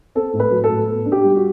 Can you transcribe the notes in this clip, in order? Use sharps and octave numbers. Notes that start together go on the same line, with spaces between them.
C4 A4
A2
B4
F#3
A4
A2
B3
D4
G4
G3
F#4